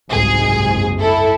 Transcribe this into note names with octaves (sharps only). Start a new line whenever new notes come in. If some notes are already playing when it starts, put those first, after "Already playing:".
F#1 C2 G#2 G#4
E4 A4